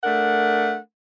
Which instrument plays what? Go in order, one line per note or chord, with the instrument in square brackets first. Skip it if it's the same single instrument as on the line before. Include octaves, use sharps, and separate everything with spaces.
[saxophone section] A3 D4 A#4 F#5